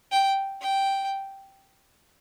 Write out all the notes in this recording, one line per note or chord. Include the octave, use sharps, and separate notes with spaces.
G5
G5